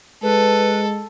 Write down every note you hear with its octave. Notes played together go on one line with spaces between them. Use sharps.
G#3 A4 B4